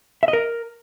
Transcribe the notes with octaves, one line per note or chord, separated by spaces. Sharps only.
E5
D#5
A#4